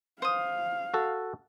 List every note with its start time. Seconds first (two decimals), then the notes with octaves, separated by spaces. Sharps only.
0.22 C5 F5 D#6
0.94 F#4 A4